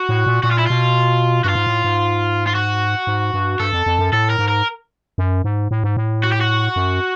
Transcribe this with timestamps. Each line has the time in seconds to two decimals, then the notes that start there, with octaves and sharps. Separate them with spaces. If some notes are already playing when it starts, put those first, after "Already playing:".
Already playing: F#4
0.09 A2
0.27 A#2
0.43 A#2 F#4
0.51 F4
0.59 E4
0.67 B2 F4
1.44 G2 F4 F#4
1.55 G#2
1.67 A2
1.85 G#2
2.47 F4
2.55 F#4
3.07 G#2
3.34 G2
3.60 G2 A4
3.73 F2
3.86 F2
3.99 F#2
4.13 A2 A4
4.30 A#4
4.39 G#2
4.48 A#4
5.18 F#2
5.44 G#2
5.71 A2
5.84 G#2
5.97 A2
6.24 F#4
6.32 G4
6.41 F#4
6.76 F#2